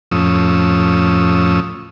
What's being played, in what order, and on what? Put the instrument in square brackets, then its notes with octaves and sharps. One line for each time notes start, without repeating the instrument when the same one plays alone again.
[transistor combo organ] F2 A2 F3 C#4 D#6 E6